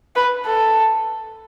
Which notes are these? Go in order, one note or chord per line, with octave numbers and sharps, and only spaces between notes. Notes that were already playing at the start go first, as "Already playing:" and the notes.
B4
A4